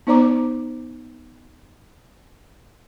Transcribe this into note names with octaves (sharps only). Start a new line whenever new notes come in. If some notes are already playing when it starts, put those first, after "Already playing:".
B3 D#4 C5 D5 A#5 D6